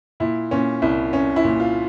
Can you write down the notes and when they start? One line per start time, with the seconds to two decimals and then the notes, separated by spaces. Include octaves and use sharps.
0.20 A#2 E4
0.51 A#2 C#4
0.82 C2 E4
1.13 C2 C#4
1.36 E4
1.44 A#2
1.60 F4